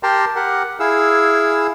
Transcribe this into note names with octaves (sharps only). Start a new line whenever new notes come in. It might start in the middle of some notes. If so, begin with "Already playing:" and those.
G4 A#4 G5 A5 A#5 C6
G4 A#4 F#5
E4 G#4 F5 E6